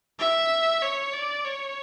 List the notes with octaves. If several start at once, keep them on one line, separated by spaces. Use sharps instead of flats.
E5
C#5
D5
C#5